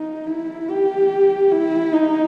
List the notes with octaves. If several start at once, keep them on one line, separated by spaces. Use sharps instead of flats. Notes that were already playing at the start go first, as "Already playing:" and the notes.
Already playing: D#4
E4
G4
E4
D#4